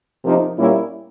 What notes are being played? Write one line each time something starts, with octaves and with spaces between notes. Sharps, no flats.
C3 F3 A#3 D#4
A#2 G3 A#3 C#4 E4